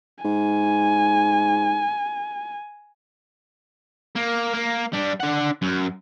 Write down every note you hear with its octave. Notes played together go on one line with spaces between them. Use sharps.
G#2 G#5
A#3
A#3
G3 D4
D4 F#5
F#2